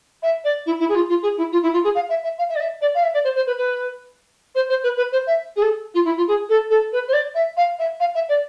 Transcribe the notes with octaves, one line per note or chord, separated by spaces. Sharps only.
E5
D5
E4
E4
G#4
F4
F4
G#4
E4
F4
E4
F4
G#4
F5
E5
E5
F5
E5
D5
E5
D5
F5
E5
D5
C5
C5
B4
B4
C5
C5
B4
B4
C5
E5
G#4
A4
F4
E4
F4
G#4
A4
A4
B4
C5
D5
E5
F5
E5
F5
E5
D5